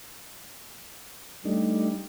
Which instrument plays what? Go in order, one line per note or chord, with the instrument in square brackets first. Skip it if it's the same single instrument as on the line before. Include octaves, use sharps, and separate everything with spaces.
[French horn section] G3 [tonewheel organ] A3 D4 D#4